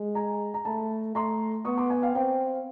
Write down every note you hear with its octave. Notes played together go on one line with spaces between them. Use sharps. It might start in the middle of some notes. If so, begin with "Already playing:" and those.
Already playing: G#3
G#5 A#5
A#5
A3 A5 B5
A3 A#5 C6
B3 C#6 D#6
C6 D6
F#5 G#5
F5 G5
C4 F5 G5